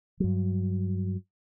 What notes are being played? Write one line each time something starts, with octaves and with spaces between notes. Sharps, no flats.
G2 F#3